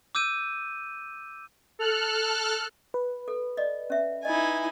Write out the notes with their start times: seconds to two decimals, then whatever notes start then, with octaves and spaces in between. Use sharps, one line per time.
0.15 D6 E6 G6 D#7
1.79 A4 F6 F#6
2.94 B4
3.28 A4
3.57 D5 D#5
3.90 C#4 E5
4.25 D#4 E4 D#5 G#5